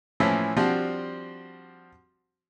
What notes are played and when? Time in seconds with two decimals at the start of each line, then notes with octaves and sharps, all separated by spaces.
0.20 A2 E3 F3 C#4 E4
0.57 F3 G3 C4 D4 F#4